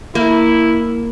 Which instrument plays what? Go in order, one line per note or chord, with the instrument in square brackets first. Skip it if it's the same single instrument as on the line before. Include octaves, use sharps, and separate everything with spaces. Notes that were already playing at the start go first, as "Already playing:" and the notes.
[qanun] A#3 [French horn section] E4